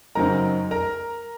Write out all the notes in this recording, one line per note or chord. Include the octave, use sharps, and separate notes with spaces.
F#2 C#3 F#3 C4 D#4 A#4 A#5
A#4 A#5